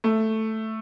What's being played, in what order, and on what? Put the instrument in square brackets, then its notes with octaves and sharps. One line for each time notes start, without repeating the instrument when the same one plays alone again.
[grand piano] A3